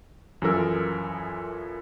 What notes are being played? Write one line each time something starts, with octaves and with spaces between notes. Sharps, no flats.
F#2 E3 F3 A4 A#4 E6